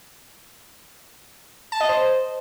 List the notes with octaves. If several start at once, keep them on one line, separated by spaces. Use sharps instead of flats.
A5
D#5
C5